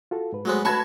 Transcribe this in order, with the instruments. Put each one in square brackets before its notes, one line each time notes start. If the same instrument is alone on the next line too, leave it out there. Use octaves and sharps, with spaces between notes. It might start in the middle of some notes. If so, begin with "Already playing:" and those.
[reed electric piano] F4 F#4 A4
G#2 B4
[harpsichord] F#3 G#3 B3 [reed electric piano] A3 F#4 C5
[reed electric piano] A3 B4 [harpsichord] F#4 C#6 [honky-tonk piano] A5 B5 G#6